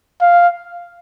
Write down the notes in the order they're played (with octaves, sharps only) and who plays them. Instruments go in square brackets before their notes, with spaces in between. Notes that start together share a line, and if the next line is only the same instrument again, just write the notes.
[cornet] F5